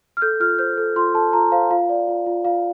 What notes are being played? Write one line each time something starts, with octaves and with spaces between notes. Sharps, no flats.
F6
A4 G6
F4 F6
C5 G6
A4
F4 C6
A4 A5
F4 A#5
C5 F5
F4 F5
D5
F4
F4
F4 F5